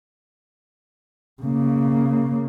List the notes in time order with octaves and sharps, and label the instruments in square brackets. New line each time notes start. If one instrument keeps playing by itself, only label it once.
[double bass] C#3 A#3